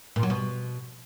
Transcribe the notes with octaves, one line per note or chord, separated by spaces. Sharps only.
A#2
F#3
B2